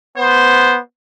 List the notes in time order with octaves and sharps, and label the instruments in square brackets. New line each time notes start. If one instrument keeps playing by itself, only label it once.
[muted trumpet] B3 [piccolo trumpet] C5